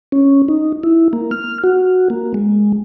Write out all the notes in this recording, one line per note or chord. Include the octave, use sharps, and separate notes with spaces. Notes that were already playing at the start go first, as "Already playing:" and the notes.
C#4
D#4
E4
A#3
F6
F#4
A#3
G#3